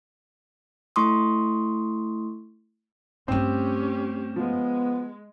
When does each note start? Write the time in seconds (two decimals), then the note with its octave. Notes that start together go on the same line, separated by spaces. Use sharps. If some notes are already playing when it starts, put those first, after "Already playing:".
0.96 A3 E4 C6 C#6 D#6
3.28 G2 A3 C4 C#4 G4
4.36 F3 G#3 B3